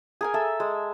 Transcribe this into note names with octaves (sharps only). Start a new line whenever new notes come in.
G#4 A#4 G#5
A4 E5
G#3